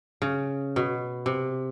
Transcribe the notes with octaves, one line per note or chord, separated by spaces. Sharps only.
C#3
B2
C3